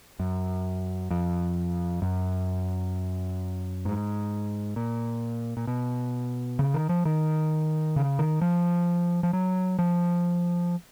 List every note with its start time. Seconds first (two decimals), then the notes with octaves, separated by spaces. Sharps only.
0.19 F#2
1.11 F2
2.02 F#2
3.85 G#2
4.76 A#2
5.57 A#2
5.67 B2
6.59 C#3
6.74 D#3
6.89 F3
7.05 D#3
7.96 C#3
8.19 D#3
8.41 F3
9.23 F3
9.33 F#3
9.79 F3